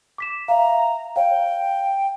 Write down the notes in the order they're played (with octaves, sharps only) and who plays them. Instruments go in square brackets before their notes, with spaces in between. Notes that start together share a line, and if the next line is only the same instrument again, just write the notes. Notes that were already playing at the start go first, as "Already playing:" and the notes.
[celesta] D6 B6 E7
[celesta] E5 F5 [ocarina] A#5
[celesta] C#5 F5 [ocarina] G5